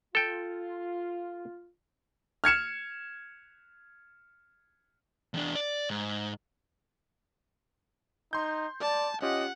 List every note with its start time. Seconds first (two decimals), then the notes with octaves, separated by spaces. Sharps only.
0.15 F4 A4 G5
2.44 F6 G#6 C#7 E7
5.34 E2 D4
5.55 D5
5.90 G#2
8.33 D#4 C6 G6
8.81 D5 A5
9.22 C#4 F4 G4 D#5 F#5